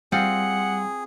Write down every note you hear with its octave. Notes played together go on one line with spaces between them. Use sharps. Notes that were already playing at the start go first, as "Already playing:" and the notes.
G3 C4 F4 G#4 F#5